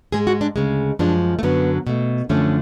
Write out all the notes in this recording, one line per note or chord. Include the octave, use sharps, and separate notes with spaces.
G#2 G#3 G#4
F#4
D4
D2 C#3 G#3
F#2 F3 G#3 D4
A3
F#2 D3 F#3 B3
B2 A3
F#2 D3 F3 A3 C#4